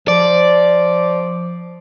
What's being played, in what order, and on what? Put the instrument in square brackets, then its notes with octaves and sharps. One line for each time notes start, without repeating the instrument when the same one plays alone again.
[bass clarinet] F3 [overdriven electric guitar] D5